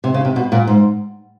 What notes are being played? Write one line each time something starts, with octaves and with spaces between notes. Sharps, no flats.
C3
C#3
C3
B2
A#2
G#2